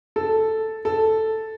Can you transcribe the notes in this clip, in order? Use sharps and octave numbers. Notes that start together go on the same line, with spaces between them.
A4
A4